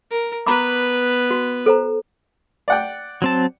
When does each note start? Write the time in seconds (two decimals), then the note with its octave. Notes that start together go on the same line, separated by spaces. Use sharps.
0.11 A#4
0.46 B3 B4 A#5 B5 D6
1.31 F#4
1.66 A4 C5 A#5
2.68 D5 F#5 G5
3.22 F#3 C4 A5